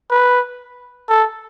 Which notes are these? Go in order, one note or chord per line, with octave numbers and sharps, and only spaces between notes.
B4
A4